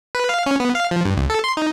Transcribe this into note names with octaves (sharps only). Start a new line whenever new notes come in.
B4
F5
C#4
B3
F5
F3
G2
C#2
A4
C6
D#4